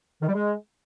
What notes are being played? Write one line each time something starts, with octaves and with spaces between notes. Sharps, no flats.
D#3
G3
G#3